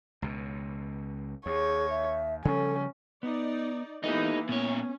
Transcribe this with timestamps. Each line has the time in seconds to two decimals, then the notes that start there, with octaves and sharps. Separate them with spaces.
0.22 C#2 B2
1.46 D#2 G#4 C#5
1.90 E5
2.45 C#3 F3 G3 C#4 A4
3.23 B3 D#4 D5
4.04 E3 A#3 B3 D#4 G4 A4 D#5
4.49 A#2 B3 C#4 C#5